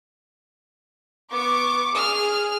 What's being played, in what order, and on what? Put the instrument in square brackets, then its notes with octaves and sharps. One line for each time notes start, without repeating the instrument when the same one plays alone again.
[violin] B3 [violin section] C#6 D6
[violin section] G#4 [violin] F6